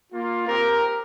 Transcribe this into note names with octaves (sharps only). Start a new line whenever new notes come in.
A#3 F4
C4 G4 A#4